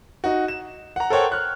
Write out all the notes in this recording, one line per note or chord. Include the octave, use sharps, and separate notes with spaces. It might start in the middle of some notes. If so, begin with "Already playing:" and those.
D#4 F#4
E7
F#5 A#5
A4 A#4 C5 C#5 F#5 G5
F6 F#6